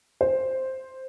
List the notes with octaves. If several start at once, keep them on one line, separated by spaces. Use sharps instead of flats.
C5